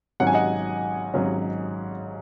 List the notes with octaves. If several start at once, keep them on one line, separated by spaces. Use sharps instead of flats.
G#1 G#2 F#3 C#4 F#5
G#5
D#5 F#5
G#1 G#2 F#3 C#4